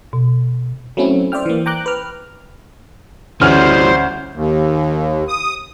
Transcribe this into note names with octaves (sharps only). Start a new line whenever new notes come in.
B2
F#3 A3 C4 C#4 E4
C5 D5 E5 G5 F6
E3 A#3
G5 A#5 D6 F#6 G6
B4 F6
D2 E3 G3 C#4 C5 F6
D#2
D#6